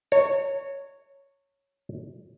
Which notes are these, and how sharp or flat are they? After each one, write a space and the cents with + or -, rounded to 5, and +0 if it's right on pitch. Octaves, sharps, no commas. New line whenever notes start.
C#5 +0 A#5 -40